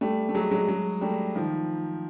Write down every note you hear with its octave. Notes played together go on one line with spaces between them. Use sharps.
G3 A3
A3
F#3 G#3
F#3 G#3
F#3 G#3
G3 A3
D#3 F3